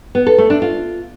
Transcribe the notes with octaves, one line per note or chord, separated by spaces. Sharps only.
B3
A4
A3
D4
F4